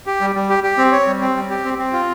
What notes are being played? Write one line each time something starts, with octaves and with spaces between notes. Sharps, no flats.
G4
G3
G3
G4
G4
C4
C#5
G3
C4
G3
G4
C4
C4
F4